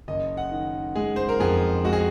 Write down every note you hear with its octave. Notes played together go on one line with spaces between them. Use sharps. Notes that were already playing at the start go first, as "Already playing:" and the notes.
F#1 D#5
F#5
D#3
G#3 G#4
C5
A#4
F2 G#4
G#3 F#4
G#4